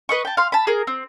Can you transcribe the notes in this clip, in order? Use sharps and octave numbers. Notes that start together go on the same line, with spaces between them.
B4 D#5 C#6
G5 A5
F5 C6
A5 B5
G#4 A#4
C4